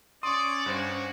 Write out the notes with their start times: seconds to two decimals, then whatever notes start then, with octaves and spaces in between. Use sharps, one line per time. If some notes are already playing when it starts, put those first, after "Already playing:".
0.23 C#4 D5 C6 C#6 D#6
0.66 G2 F#4 C5